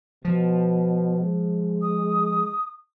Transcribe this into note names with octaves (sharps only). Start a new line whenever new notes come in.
B2 F3
G#3
D#6